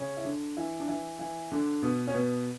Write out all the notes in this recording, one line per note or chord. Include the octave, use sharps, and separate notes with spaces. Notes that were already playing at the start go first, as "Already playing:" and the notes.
Already playing: C#3 C#4
E4
D3 D4
E3 E4
D4
E3 E4
E3 E4
D3 D4
B2 B3
C#4
B2 B3